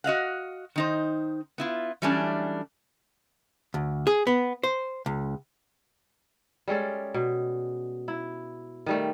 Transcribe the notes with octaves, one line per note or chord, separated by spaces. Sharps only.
F#4 D#5 F5 F#5
D#3 D#4 C5
B3 E4 F4
E3 F#3 G3 A3 C#4 D4
D2
G#4
B3
C5
C#2
G3 G#3 C#4 A4
B2
E4
D#3 G3 A3